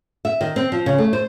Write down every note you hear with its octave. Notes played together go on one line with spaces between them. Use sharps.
E5
D#3
C4
F3
C#3
A3
C5